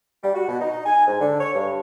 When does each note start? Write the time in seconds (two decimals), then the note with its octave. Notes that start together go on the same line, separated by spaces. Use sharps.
0.23 G3
0.34 F#4
0.48 B2
0.60 D#4
0.86 G#5
1.07 G#2
1.21 D3
1.40 C#5
1.54 G2